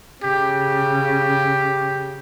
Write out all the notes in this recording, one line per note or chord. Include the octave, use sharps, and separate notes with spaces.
C#3 G4